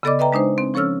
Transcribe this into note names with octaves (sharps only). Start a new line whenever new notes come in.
C#3 B3 A4 D5 D#5 D6
B4 D#5 E5 G5 A#5
G#3 D4 D#4 C5
C4
F3 C#4 A4 C#5 E6 F6